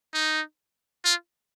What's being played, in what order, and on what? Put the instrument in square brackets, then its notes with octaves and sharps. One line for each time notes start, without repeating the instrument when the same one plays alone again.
[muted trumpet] D#4
F4